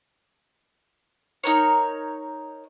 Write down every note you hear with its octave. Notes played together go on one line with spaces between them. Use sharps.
D#4 A#4 C#5